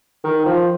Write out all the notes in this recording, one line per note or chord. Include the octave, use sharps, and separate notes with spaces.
D#3
F3